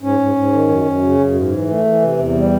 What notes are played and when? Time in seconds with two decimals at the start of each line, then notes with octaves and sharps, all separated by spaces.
0.02 G#2 C#4
0.19 G#2
0.36 G#2
0.53 D#3
0.68 F#2
0.85 F#2
1.02 C#3
1.18 F#2
1.34 G#2
1.52 E3
1.68 A3
1.85 E3
2.02 C3
2.19 E2
2.35 G3